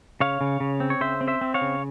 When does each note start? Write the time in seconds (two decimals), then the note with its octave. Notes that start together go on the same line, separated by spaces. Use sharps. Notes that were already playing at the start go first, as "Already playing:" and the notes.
0.20 C#3 C#5 F5
0.41 C#3
0.60 C#3
0.80 C4
0.90 C#5
1.01 C#3 C5 E5
1.21 C4
1.28 C5 E5
1.41 C4
1.54 C#5 F5
1.61 C#3